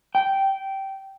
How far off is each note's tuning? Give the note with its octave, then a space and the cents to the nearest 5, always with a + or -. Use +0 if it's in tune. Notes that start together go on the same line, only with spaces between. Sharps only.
G5 -15